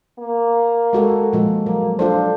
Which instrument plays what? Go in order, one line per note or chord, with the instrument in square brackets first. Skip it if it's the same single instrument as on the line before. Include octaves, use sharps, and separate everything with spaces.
[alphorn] A#3
[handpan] G#3 F#4 A4
A#2 F3 G#3
[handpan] F#3 [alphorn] A#3
[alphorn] D4 [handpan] F4 A4 C5